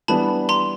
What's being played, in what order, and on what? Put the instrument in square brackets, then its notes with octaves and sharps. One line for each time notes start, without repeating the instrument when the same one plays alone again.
[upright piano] E3 G3 B3 D4 [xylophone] A5 B5
[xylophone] A#5 C6